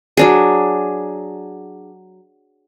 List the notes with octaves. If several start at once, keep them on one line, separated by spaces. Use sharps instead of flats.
F#3 D4 G#4